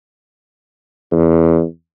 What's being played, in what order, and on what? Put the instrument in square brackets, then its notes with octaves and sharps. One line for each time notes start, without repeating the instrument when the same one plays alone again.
[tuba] E2